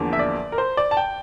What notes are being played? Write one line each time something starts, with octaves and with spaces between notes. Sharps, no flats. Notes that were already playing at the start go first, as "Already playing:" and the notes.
Already playing: E2 D3 F3 A#3
E5
D5
A#4
C5
D5
A5
G5